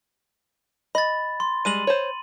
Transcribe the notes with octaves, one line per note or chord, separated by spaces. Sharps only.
D#5 B5 A6
C6
G3 G#3 D#7 F#7
C5 C#5